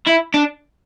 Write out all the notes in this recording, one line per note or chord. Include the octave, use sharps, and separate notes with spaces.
E4
D4